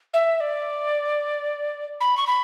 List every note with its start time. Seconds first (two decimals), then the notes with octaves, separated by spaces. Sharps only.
0.14 E5
0.41 D5
2.01 B5
2.17 C#6
2.27 B5